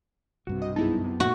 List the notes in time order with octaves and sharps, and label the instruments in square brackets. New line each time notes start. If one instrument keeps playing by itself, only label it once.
[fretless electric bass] B1 G2 C3 [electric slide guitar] F#4
[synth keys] D#5 D#6
[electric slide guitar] F#2 B3 A5 [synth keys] D#4 E4 G#4
[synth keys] C3
[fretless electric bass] A#2 A#3 [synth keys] A3 [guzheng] F#4